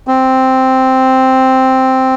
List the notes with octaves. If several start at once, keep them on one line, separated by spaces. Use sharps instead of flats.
C4